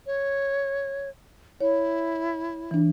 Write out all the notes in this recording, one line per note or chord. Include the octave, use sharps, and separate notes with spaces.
C#5
E4 C#5
E3 D4